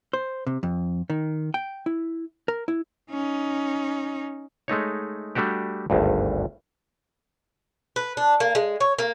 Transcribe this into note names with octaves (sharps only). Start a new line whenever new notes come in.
C5
C3
F2
D#3
G5
E4
A#4
E4
C#4 D#4
G#3 A3 D#4 C#5
G3 A3 D4 F#4 G4
G#1 D2 G2
B4
D4
A#3
G#3
C#5
A#3